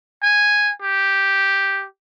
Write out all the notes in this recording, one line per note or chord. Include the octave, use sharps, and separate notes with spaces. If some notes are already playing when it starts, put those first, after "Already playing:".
G#5
G4